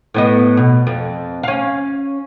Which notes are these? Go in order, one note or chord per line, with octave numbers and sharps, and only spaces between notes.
A2 B3 D#5
B2
F2
C#4 F5